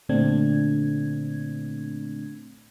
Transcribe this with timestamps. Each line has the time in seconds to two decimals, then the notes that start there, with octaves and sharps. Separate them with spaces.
0.09 A#2 D3 A3 C4 D4 G#6